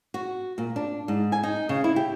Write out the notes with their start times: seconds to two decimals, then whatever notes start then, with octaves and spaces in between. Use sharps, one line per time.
0.14 F#4
0.58 A#2
0.76 D4
1.08 G#2
1.32 G#5
1.43 D#4
1.69 C#3
1.84 E4
1.96 G4